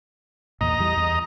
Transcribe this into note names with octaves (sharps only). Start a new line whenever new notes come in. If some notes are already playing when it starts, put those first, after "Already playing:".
E2 A#2 D#5 A#5
E2 E3 G3
E2